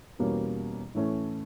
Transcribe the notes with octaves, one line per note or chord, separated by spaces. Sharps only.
E2 B2 G3 A#3 C#4
A2 E3 A3 C#4